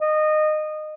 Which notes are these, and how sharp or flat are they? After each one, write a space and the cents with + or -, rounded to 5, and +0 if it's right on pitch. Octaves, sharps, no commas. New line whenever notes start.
D#5 -20